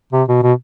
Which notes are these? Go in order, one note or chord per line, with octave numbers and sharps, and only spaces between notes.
C3
B2
B2